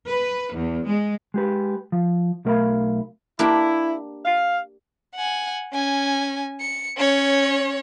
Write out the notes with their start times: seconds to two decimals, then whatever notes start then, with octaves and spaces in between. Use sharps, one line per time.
0.10 B4
0.55 E2
0.87 G#3
1.34 G#3 G4 B4
1.92 F3
2.45 B1 A3 A#4 D#5 F5 B5
3.39 A#3 D4 E4 G4
4.25 F5
5.16 F#5 G#5
5.73 C#4 G#5
6.60 C#7
6.97 C#4 C#5